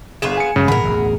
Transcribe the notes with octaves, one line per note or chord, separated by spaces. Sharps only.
G1 B3 F4 G#4 E7
G#5 C#7
F#2 C#3 F#3 G#3
G#2 B2 E3 G#4 A#4 F#5 B5
E1 A1 D2